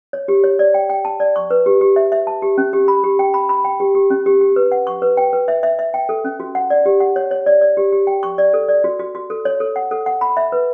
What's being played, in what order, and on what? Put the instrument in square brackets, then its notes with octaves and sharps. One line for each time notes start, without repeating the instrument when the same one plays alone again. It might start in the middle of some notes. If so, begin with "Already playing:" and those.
[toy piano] C#5
G4
C#5
D5
G5
G5
A5
D5
C#6
B4
G4
G4
E5
E5
A5
G4
C#4
G4
B5
G4
G5
B5
B5
G5
G4
G4
C#4
G4
G4
B4
F#5
C#6
B4
G5
B4
E5
E5
E5
G5
A4
C#4
F#4
F#5
D5
G4
F#5
C#5
C#5
D5
D5
G4
G4
G5
C#6
D5
A4
D5
F#4
F#4
F#4
A4
C#5
A4
F#5
A4
F#5
B5
E5
B4